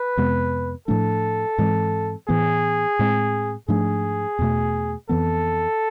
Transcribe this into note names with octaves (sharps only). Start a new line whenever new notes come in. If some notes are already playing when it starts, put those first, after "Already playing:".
Already playing: B4
F2 C3 G#3 B3
A2 F3 A3 D4 A4
G#2 E3 G#3 C4
A2 E3 B3 G#4
A2 G#3 C4
G#2 F3 A3 D4 G#4
E2 B2 A3
F2 E3 B3 A4